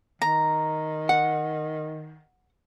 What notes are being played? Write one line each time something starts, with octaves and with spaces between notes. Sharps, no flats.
D#3 A#5
F#5